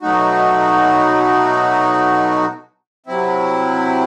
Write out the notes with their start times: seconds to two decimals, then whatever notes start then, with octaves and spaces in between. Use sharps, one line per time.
0.02 B2 F#3 A3 D#4 F#4
3.06 C3 F#3 C4 E4